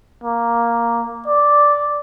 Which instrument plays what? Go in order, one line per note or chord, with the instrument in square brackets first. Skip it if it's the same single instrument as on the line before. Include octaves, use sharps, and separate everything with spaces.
[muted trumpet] A#3
D5